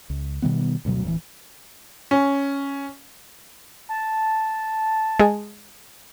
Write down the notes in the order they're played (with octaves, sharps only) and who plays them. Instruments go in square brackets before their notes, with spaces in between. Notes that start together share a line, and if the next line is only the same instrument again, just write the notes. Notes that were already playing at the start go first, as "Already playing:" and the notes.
[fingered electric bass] C#2
B2 D#3 G3 B3
D2 G2 B2 F#3
D1 E3
[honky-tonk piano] C#4
[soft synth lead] A5
[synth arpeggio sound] G#3 G#4